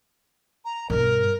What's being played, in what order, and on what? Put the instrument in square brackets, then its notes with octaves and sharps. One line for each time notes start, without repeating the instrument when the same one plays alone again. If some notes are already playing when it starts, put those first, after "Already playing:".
[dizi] A#5
[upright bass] G2 B2 [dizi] A#4